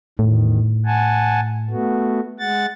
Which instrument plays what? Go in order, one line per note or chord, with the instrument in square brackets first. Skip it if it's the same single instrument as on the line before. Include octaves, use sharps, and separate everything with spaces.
[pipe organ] E2 D#3 [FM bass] A2
[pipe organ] F#5 G#5 A5
A3 B3 F#4
G#3 F#5 A6